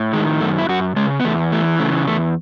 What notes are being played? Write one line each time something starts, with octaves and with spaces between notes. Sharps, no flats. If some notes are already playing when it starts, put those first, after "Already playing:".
Already playing: A2
D#3 G#3
F#2 A3
E4
F#2 F#4
C#3 G#3
B3
E2 A3
E3 A3
C#3 A3
E2 A3